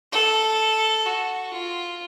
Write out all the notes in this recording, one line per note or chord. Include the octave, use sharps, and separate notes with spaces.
A4
F#4
F4